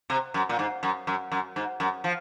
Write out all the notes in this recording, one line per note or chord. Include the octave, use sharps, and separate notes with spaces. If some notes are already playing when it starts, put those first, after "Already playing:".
C3
F#2
A#2
G#2
F#2
F#2
F#2
G#2
F#2
F3